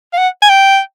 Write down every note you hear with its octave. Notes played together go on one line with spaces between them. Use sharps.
F5
F#5
G#5
G5